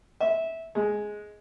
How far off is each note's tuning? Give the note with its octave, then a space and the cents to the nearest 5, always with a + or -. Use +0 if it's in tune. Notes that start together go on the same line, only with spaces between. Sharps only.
E5 -15
G#3 +5